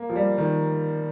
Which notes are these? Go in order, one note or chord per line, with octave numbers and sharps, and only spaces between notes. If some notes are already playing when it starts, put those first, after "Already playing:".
Already playing: A#3
F3
G3
D#3